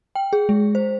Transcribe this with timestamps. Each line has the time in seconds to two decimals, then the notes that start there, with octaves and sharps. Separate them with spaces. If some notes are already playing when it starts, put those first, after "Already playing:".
0.15 G5
0.33 G#4
0.49 G#3
0.75 C5